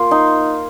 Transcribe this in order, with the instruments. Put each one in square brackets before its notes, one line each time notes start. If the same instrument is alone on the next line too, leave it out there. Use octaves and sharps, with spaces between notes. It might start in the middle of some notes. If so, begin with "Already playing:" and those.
Already playing: [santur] A#3 F4 C6
D#4